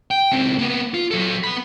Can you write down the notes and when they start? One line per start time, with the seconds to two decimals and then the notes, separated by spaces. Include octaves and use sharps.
0.11 G5
0.32 C#2 C4
0.59 A#3 B3
0.94 F4
1.11 F#3 A4
1.44 B3 B5